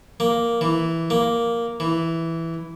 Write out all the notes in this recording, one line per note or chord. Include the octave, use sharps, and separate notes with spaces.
A#3
E3
A#3
E3